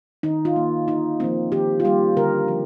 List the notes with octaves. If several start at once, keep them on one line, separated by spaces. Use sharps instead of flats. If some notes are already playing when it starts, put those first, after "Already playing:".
D#3 D#4
F4
A#3
D3 D#4
F3 A#3 C4
D#3 G4
F4
G3 A#3 G4
D3 A#4
F3